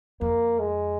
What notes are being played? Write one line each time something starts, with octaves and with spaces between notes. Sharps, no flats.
F2 A#3
G#3